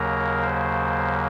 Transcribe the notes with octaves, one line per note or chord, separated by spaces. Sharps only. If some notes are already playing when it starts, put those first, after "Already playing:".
Already playing: D#2 C#3 F#3 A#3 A#4
C5